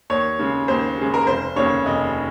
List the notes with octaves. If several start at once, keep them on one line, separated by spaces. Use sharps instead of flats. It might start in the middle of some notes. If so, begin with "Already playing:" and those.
D#2 C#5
C#3 G#3
D#2 C5
C#3 G#3
A#4
F1 C5
D#2 C#3 C#5
F1 D#5